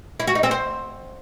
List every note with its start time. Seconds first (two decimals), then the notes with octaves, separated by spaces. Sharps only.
0.20 E4
0.27 F#4
0.35 D#4
0.43 C4
0.51 C5